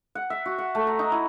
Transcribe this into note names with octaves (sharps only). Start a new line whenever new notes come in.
F#5
E5
F#4
F#5
A3
A#5
D#4
E4